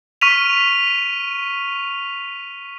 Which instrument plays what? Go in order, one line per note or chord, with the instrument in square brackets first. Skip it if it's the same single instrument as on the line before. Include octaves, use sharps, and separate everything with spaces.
[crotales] C#6 F6 B6 D#7 F7